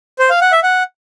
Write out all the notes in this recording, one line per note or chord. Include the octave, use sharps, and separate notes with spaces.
C5
F5
F#5
E5
F#5